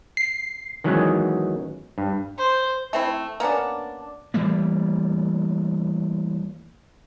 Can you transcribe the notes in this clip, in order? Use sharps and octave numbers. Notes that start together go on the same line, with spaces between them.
C7
D#3 E3 F#3 G#3 B3 C#4
G2
C5
A3 C4 E4
A#3 B3 C#4 D4
E3 G3 A3 A#3